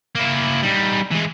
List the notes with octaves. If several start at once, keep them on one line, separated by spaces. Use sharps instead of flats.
A#3 E4
G3 D#4
E3 G#3